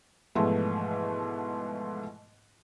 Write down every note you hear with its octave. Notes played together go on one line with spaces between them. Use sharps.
G#2 B2 E3 F3 A3